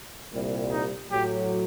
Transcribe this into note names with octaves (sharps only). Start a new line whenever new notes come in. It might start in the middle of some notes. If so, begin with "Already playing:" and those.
C2 A#2 G3
D#4
A2 F#3 G4